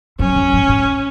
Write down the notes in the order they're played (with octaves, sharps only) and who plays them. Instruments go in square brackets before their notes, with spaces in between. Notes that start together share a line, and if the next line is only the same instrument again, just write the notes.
[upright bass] F#2 [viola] C#4
[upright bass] F#2
G#2
G#2